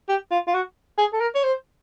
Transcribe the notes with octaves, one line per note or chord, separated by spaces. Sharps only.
G4
F4
F4
F#4
G#4
A4
A#4
C#5
C5